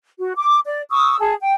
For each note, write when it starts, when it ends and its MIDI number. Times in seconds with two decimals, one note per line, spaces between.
0.20 0.33 66
0.37 0.59 86
0.66 0.82 74
0.91 1.16 85
0.91 1.16 87
0.91 1.16 88
1.20 1.34 68
1.20 1.34 81
1.41 1.55 79